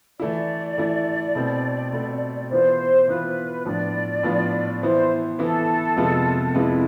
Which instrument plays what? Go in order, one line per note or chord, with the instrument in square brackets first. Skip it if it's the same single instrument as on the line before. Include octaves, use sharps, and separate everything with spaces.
[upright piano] E3 A3 E4 [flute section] D5
[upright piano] E3 A3 E4
B2 A3 C4
B2 A3 C4
[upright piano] E3 B3 F4 [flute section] C5
[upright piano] E3 B3 F4 [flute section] B4
[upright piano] A2 F3 B3 D4 F4 [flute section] D5
[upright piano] A2 F3 B3 D4 F4
[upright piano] E3 B3 E4 [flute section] C5
[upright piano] E3 B3 E4 [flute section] A4
[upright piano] F2 C3 G#3 B3 F4
[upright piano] F2 C3 G#3 B3 F4 [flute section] E4